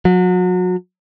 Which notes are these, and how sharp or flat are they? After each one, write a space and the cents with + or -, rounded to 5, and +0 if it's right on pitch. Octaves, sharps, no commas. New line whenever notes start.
F#3 -30